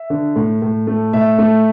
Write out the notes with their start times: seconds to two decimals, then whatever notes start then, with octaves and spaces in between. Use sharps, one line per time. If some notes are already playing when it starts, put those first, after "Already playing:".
Already playing: E5
0.10 D3
0.36 A2
0.62 A2
0.87 A3
1.13 A2 E5
1.39 A3